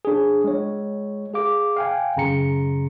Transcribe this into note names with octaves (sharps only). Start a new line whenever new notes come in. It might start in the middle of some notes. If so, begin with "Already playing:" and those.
D4 G#4
G#3 C#5
G#4 F5 D6
F5 G5 G#5
F#2 C#3 A#5 C#7